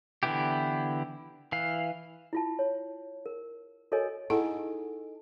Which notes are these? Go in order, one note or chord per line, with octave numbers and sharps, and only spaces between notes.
D3 E3 B3 E4 G4
E3 F5
E4 F4 A5
C#5
A#4
F#4 A4 A#4 C#5 D#5 G#5
D#4 E4 G#4 A4 F#5